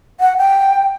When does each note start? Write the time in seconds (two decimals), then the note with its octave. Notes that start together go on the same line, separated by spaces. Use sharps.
0.20 F#5
0.38 G5